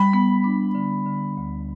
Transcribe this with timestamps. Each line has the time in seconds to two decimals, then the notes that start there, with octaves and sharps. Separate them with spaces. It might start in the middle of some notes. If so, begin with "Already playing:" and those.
Already playing: G3 B5
0.13 B3
0.44 D4
0.75 D3
1.06 D3
1.37 D2